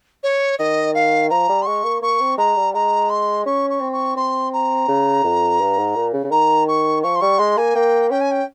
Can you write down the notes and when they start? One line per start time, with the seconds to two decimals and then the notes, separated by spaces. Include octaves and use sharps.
0.23 C#5
0.59 D#3 D#5
0.94 F5
1.30 F3 A#5
1.49 G3
1.62 C6
1.66 G#3 C#6
1.84 A#3
2.02 A#3 C#6
2.20 C4
2.38 G#3 A#5
2.56 G3
2.74 G#3 A#5
3.09 C6
3.46 C#4 C#6
3.70 C#6
3.81 C4
3.92 C#6
4.16 C4 C6
4.53 A#5
4.88 C#3
5.24 F2
5.61 G2
5.77 G#2
5.96 A#2
6.13 C#3
6.24 C#3
6.31 D#3 A#5
6.68 C#6
7.03 F3 C#6
7.15 C6
7.21 G3 C#6
7.39 G#3 C6
7.57 A#3 G#5
7.75 A#3 G5
8.11 C#4 G5
8.21 G#5
8.31 G5